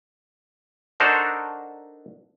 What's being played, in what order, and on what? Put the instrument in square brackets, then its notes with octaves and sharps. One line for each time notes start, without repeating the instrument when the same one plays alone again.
[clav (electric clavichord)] D4 D#4 F#4 A4 A#4 C5